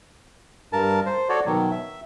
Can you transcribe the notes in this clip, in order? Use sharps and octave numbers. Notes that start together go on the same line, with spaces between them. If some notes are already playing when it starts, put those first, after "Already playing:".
G2 A#4 A5
C5
F#4 A4 C#5 D5
B2 D#3 F#3
E5